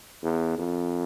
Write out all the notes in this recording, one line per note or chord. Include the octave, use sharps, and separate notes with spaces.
E2
F2